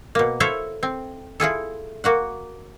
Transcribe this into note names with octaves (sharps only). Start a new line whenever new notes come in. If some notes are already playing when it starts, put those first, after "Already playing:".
B2 A#3
E4 A4 C5 C#5 E5 F5
C4
E4 F4 G#4 A4
A#3 F#4 F#5